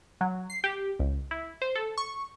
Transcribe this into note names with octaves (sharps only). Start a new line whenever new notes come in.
F#3
C7
G4
C#2
E4
C5
A4
C#6